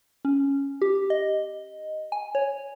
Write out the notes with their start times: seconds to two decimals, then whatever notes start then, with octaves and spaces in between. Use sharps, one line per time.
0.25 C#4
0.82 G4
1.10 D#5
2.12 G#5
2.35 C#5